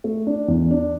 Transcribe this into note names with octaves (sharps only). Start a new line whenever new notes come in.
A3
D4
E2
D4